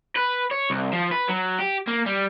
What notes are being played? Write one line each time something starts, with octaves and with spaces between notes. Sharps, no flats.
B4
C#5
C2
F3
B4
F#3
G4
A#3
G3